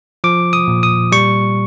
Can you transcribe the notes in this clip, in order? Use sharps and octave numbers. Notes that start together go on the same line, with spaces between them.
F3 D6
D#6
A#2
D#6
G3 C#6